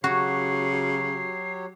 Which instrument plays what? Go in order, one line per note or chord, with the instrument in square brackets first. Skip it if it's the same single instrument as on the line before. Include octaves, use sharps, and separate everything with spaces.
[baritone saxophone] C#3 [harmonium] F#3 G4 C#5 [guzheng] F#4 [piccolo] C7